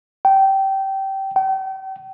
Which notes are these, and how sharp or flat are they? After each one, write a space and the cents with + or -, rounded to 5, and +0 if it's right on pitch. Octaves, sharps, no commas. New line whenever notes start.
G5 -20
G5 -40